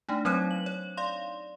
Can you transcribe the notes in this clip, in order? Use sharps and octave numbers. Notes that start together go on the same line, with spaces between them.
A3 D4 D#4
F#3 C4 D#4 C5 C#5
F#7
C#5
D5 F5 C6